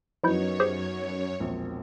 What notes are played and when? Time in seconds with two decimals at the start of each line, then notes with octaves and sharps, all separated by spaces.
0.24 F#2 F3 F#3 B3 D#4 E4 C#5 G6
0.60 G4 G#4 C5
1.40 E1 A#1 C4